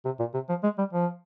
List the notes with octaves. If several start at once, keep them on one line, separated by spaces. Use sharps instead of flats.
C3
A#2
C3
F3
G#3
G3
F3